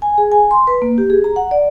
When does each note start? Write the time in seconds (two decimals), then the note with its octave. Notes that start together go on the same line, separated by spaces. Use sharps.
0.02 G#5
0.18 G#4
0.32 G#5
0.51 C6
0.67 B4
0.82 A#3
0.98 G4
1.10 G#4
1.24 A#5
1.36 F#5
1.51 D5